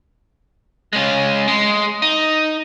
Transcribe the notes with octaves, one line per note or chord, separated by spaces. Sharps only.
G#3 C#4
G#3
D#4